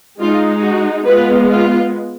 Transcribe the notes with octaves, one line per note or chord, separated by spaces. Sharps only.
G#3 D#4 F4
F#4
G#3 B3 F4 B4
F4